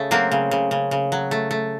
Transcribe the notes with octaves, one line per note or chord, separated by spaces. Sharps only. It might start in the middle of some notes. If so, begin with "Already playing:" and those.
Already playing: C#3 A3
F#3 A#3 C4
C#3
C#3
C#3
C#3
F#3
A3
A3